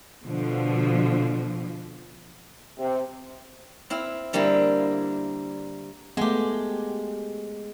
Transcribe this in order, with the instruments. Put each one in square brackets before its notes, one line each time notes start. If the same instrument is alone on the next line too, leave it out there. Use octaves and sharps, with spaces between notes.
[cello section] B2 D3 F3
[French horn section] C3
[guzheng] C4 E4 F5
D3 G3 A#3 C4 D4 E4
[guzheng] G#3 G4 [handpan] A3 B3